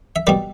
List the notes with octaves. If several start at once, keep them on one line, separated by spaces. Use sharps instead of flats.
E5
B2 G3 B4 D5